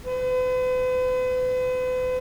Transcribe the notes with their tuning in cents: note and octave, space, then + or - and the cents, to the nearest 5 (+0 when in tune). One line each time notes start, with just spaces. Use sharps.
B4 +45